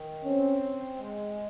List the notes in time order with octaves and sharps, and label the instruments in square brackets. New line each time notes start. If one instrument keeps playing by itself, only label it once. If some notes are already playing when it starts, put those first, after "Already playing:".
Already playing: [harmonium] D#3
[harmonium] C4 [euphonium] C#4
[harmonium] G#3